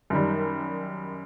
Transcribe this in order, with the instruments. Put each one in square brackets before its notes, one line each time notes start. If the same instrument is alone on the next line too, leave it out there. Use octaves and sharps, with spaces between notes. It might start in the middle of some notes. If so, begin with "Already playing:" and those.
[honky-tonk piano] F#2 D#3 G3